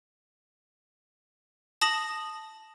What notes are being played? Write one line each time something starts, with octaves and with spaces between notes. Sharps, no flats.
A5 D#6 A#6 F#7